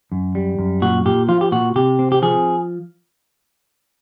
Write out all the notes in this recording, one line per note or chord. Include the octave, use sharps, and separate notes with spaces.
F#2
G3
F#2
A#2 F#4
A#2 G4
F3 F4
G4
A#2 F#4
C3 G4
C4
G4
F3 G#4